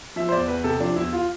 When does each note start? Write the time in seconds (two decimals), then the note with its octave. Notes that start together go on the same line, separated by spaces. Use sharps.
0.16 F3 E5
0.29 C5
0.32 E2 D5
0.48 E2 B4
0.64 C3 A4
0.80 F3 D4
0.96 E2 E4
1.13 F4